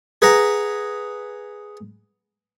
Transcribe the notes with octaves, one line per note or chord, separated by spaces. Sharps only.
G#4 B4 F#5 A#5